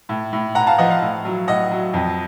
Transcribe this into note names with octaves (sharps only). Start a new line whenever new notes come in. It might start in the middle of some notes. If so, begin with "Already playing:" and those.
A2
A2
A2 F#5 A#5
F5 A5
F3 D#5 F#5
F5
A2
F#3
A2 D#5 F#5
F#3
F2